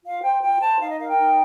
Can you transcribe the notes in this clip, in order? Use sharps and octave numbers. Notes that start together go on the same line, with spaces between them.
F4 F5
C5 G5
F4 G5
C5 A5
D#4 F5
D#5
A#4 F5
G5
D#4